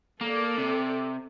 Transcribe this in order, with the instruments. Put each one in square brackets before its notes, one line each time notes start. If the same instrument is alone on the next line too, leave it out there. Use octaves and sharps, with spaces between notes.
[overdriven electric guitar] A#3 [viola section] A4 D5
[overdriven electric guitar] C3